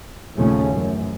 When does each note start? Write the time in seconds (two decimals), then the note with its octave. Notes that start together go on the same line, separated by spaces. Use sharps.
0.36 A#1 D#2 C#3 F3 A3 C#4
0.72 A1 F#2